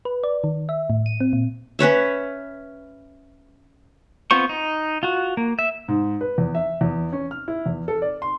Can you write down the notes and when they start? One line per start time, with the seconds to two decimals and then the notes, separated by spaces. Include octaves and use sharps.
0.05 B4
0.24 D5
0.44 D#3
0.69 E5
0.90 A2
1.06 D#7
1.20 C4
1.33 A#2
1.79 C#4 B4 C#5 E5
4.31 B3 C4 F4 C5 C#6
4.49 D#4
5.03 F4 F#4
5.37 A#3
5.59 E5
5.88 G#2
6.21 B4
6.38 E2
6.55 E5
6.81 E2
7.13 C#4
7.31 F6
7.48 E4
7.66 E2
7.88 A4
8.02 D5
8.22 C6